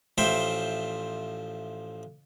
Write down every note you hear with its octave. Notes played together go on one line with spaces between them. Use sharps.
A1 F3 C5 E5 G5